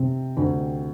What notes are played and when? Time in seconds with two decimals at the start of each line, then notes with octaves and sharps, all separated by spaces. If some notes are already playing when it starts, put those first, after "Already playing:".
Already playing: C3 C4
0.37 D2